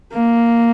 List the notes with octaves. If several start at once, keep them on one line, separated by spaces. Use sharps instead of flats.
A#3